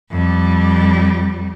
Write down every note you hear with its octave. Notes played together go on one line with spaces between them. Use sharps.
F2 G3